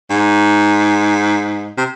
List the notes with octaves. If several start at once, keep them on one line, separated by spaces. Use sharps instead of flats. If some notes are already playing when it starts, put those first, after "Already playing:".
G#2
C3